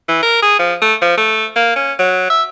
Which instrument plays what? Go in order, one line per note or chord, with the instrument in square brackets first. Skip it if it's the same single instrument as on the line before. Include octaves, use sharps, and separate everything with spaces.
[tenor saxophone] E3
A#4
G#4
F3
A3
F3
A3
A#3
C#4
F#3
E5